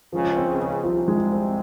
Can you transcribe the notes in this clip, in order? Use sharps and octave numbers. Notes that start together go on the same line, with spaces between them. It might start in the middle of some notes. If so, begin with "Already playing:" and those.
C#2 C#3 F3
C4
C#2 C#3
C4
C2 C3 F3
G#3
C4